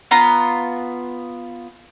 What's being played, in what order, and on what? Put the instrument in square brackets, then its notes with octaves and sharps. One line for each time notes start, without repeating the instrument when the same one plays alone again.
[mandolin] B3 F4 A#5